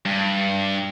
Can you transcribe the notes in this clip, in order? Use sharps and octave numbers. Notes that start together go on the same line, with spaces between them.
G2